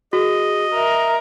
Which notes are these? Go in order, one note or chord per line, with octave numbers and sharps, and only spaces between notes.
F#4 G#4 D#5
A#4 E5